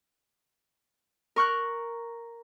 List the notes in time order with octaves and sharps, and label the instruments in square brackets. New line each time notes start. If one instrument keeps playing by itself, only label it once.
[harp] A#4 C#6 F6 F#6